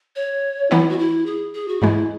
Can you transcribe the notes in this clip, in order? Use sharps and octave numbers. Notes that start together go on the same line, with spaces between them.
C#5
E3 B3 D#4 E4
F#4
E4
G#4
G#4
F#4
G#2 E3 G#3 E4